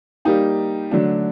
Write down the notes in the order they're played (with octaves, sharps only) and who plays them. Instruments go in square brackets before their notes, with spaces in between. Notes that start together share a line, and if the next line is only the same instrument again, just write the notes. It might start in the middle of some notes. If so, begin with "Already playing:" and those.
[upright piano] G3 A#3 D#4 G4
D3 F#3 A3 D4